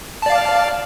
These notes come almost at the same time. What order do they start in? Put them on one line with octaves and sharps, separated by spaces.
A5 D5 F5